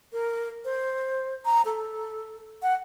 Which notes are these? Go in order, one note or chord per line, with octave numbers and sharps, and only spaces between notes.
A#4
C5
A#5
A4
F#5